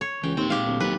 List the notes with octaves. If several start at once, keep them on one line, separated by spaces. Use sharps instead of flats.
C#5
C#2 E3 G5
D#2 A#2 C4 G5
G#2 G4 F5
D1
D#2 F#3 D#4 B4